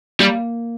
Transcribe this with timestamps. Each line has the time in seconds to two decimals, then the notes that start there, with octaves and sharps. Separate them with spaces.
0.20 G3 A#3